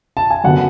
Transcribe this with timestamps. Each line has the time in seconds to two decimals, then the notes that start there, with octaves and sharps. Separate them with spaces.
0.17 A5
0.31 G#5
0.44 F#2 D3 F#3 B3 F#5